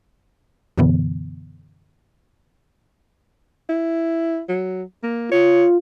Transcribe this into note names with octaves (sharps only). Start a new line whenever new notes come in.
F#2 B2 D3 E3 B3
E4
F#3
A#3
F4 C#5